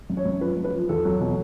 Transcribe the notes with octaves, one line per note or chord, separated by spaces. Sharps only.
F#2
C#5
F#2
F3 B4
F#2
B4
F3
E2 A4
F#3
B2